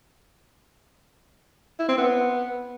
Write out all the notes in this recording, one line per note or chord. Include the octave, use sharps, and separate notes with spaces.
E4
C4
B3